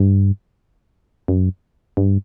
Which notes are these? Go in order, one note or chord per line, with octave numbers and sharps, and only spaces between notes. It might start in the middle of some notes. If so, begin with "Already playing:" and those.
Already playing: G2
F#2
G2